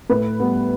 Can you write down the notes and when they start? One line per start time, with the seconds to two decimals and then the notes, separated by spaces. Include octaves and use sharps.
0.10 A2 B4
0.40 G3 B3